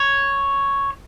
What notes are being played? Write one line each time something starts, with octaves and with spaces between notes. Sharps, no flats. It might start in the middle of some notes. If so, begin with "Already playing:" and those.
Already playing: C#5